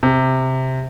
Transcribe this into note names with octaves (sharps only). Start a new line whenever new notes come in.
C3